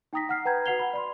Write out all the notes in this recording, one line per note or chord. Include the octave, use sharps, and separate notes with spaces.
D#4 G5 A#5 D#6 A#6 B6
F#5 F6 C7
B4 G5 A#5 B5 G6 G#6
F#4 B4 F#5 C7 F7 G7
B5
D5 B5 C6